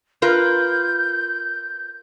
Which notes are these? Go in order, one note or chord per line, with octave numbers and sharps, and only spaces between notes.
F4 A#4 B4 G6